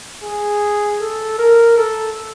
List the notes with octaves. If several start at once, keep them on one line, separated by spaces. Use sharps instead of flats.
G#4
A4
A#4
A4